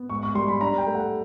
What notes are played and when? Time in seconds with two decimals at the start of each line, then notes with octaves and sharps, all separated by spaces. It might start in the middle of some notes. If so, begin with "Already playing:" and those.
Already playing: B3
0.09 G#2 C#6
0.23 C#6
0.35 G3 C6
0.48 B5
0.61 D4 A#5
0.78 G5
0.87 A3
0.95 F#5